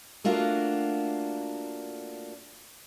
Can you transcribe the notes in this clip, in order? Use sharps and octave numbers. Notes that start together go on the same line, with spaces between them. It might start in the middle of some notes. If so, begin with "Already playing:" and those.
A3 A#3 D4 F4 F#4 A#4